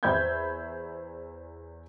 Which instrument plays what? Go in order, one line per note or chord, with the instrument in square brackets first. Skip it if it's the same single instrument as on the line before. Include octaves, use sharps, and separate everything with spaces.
[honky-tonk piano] E2 C5 E5 B5 G6 G#6